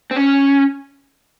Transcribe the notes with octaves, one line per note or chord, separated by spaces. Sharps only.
C4
C#4